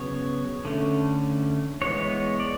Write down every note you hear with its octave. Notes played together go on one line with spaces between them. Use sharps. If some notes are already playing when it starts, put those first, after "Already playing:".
Already playing: C#3 F#3 B3 C#5
D3 A3 C#4
E3 G#3 B3 C#5
D5